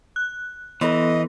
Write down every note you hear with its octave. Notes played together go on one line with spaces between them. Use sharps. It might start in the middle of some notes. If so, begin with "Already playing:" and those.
F#6
E3 B3 A4 D#5